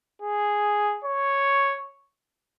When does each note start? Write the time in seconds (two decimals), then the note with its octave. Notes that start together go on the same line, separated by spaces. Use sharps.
0.22 G#4
1.04 C#5